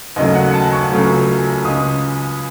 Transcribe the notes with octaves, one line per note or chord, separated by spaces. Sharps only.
D#2 C#3 F#3 A3 D#5
F#5
A5
C#6
C#2 C#3 F#3 A3
C#2 C#3 G#3 D#6